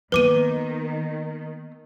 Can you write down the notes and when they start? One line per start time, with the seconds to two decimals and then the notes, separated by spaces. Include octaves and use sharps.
0.12 D#3 A#3 B3 B4 D6 D#7